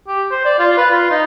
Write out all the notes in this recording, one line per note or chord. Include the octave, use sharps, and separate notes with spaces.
G4
C5
D5
F4
B4
F4
D#4